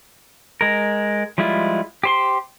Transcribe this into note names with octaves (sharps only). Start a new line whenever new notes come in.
G#3 A#4
F3 G3 G#3 E4 F4
G4 C5 C6